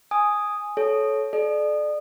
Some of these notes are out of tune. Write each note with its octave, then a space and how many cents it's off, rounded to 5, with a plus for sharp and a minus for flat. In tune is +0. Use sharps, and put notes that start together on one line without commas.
G#5 +0 D#6 +0
A4 -30 C#5 +0
A4 -40 D5 +25